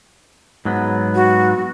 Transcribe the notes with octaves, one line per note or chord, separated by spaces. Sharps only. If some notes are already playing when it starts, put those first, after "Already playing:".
G#2 F#3 B3
F#4